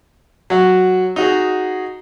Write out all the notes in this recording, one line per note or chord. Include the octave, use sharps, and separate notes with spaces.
F#3 F#4
D#4 F#4 G#4